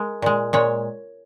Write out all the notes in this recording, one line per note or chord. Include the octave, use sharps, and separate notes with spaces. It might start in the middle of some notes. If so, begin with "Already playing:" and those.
Already playing: G#3 A#4
A#2 G#3
A#2 G#3 C#5